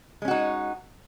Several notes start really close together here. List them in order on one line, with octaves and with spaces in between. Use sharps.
G#3 C#4 F#4 D#4